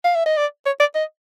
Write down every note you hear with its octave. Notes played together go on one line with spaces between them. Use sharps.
F5
E5
D#5
D5
C#5
D5
D#5